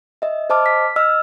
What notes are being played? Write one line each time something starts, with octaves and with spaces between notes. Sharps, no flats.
D#5 E5
C5 D#5 A5 D6 F6
B6
D#5 E6 F6